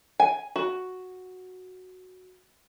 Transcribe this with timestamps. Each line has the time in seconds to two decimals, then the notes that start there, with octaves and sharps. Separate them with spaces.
0.20 G#5
0.56 F#4